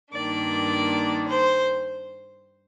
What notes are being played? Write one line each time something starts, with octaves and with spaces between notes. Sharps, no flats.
G2 D#3 A#3 D4 D5
C5